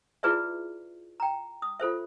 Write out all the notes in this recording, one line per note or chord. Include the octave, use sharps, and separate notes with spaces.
E4 F4 G#4 B4 D5 E5
G5 A#5
D#6
F4 A4 C5 E5